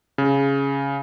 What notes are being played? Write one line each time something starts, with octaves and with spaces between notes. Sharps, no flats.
C#3